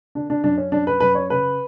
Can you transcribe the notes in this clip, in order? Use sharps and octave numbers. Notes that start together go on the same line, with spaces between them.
D3 D4
D4
F#2 D4
C#4
F#2 D4
B4
F#2 B4
C#5
C#3 B4